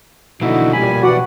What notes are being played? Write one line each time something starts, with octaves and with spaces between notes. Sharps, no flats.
B2 D3 E3 F3 A#3 D#4 E4 F#4
A#2 G3 G#5 B5
E3 F#4 D5 F#5